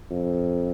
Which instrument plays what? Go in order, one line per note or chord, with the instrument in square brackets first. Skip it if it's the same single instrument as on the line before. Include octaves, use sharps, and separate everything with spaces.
[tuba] F2